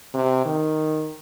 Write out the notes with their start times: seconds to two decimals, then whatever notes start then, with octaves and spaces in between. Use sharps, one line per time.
0.14 C3
0.45 D#3